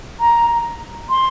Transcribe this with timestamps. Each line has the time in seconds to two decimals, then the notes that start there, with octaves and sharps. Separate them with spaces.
0.20 A#5
1.10 C6